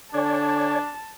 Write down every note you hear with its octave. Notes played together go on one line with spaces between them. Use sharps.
D3 D4 C#5 D5 G#5 A5